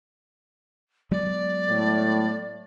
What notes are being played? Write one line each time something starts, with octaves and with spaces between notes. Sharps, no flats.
F#3 G#3 B3 D5
A2